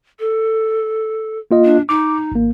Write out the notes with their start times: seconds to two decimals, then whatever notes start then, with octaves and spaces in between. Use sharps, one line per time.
0.20 A4
1.51 A#3 F4 D#5
1.65 D4
1.89 D#4 D6
2.32 G#1 A#3